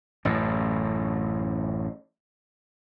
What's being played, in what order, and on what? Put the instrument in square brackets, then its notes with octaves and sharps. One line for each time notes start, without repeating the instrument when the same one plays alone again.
[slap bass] A1 F#2 A2